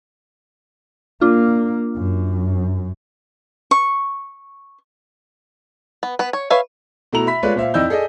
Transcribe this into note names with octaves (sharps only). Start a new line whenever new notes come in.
A#3 D4 F4
F#2
C#6
B3
B3 B4
C#5
B4 C#5 E5 F5
B2 A3 E4 A#5 F7
E5 B5 B6
G#3 A3 F4 B4 C#5 D5
A#2 C5 E5 F5
F2 D#4 E4 D5 E6 G6
G#4 A4 D5 D#5